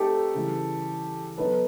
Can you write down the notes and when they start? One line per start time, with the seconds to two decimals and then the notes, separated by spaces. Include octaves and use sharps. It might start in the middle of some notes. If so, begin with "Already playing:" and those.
Already playing: A3 C4 D#4 G4 A4
0.35 C#3 E3 G3
1.37 F#3 B3 D#4 A4 B4